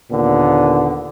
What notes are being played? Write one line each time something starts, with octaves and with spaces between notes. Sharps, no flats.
D#2 A#2 D3 B3